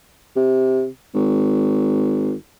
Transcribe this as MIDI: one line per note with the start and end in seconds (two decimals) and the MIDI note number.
0.36 0.88 48
1.14 2.35 32